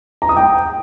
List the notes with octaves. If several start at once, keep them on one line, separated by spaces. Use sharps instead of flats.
A#5
D#6
G5